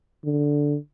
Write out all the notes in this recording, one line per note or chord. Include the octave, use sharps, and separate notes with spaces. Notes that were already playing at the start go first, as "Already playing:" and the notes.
D3